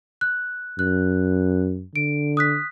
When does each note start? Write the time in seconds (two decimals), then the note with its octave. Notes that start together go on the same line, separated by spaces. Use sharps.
0.21 F#6
0.79 F#2 F#6
1.96 D3 D7
2.37 D#6 F#6 B6